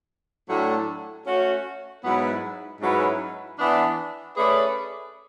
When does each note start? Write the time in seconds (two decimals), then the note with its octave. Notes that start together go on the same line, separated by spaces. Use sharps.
0.48 A2 F#3 A3 D4
1.26 A3 C#4 F#4
2.03 G#2 F#3 B3 E4 B4
2.81 G#2 F#3 C#4 E4 B4
3.58 E3 B3 D4
4.37 A3 C#4 G#4 B4 D5